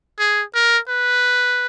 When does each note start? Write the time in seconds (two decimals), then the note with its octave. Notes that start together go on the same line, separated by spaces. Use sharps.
0.19 G#4
0.54 A#4
0.88 B4